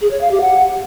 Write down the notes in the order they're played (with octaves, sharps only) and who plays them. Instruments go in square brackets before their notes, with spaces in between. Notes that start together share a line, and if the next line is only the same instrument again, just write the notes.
[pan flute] G#4
C#5
F5
G4
F#5